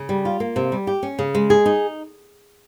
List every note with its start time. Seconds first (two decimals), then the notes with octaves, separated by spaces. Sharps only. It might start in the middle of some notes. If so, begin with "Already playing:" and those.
Already playing: C#3
0.09 G3
0.25 F4
0.40 A#3
0.56 C3
0.72 G3
0.87 G4
1.03 C#4
1.19 C#3
1.35 G#3
1.50 G#4
1.66 D#4